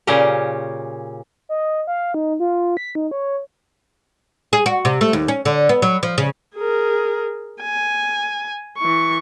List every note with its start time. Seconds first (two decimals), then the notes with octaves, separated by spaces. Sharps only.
0.07 A#2 C#3 C#4 G4 A#4
1.49 D#5
1.87 F5
2.14 D#4
2.40 F4
2.77 B6
2.95 D#4
3.11 C#5
4.53 G#4
4.66 F#4
4.85 C3
5.01 A3
5.13 D#2
5.28 C#4
5.45 D3
5.69 B3
5.82 F#3
6.03 F3
6.18 C#3
6.56 G#4 A#4
7.62 G#5
8.78 E3 C#6